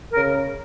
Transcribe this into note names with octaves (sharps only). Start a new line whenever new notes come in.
C#3 A#4